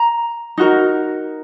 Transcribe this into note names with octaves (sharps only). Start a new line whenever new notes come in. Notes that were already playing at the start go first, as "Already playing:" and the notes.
Already playing: A#5
D#4 F#4 A#4